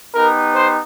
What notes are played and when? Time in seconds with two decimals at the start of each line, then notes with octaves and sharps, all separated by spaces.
0.15 B3 D#4 G4 A#4
0.55 C5